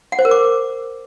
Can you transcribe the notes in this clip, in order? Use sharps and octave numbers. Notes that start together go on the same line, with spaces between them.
F#5
C5
A#4
D6